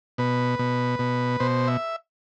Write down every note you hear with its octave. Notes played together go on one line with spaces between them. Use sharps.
B2 B4
B2
B2
B2 C5
E5